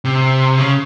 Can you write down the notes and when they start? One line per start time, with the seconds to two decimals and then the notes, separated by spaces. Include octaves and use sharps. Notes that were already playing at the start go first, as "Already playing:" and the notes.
0.05 C3
0.58 C#3